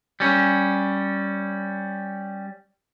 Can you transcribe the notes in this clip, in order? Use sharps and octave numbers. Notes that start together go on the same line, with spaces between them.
G3 C#4